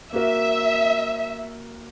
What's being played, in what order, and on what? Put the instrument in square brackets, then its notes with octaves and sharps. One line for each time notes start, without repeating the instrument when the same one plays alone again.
[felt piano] A#3 F#4 A#4 [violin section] E5